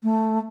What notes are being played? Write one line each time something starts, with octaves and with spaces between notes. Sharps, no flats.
A3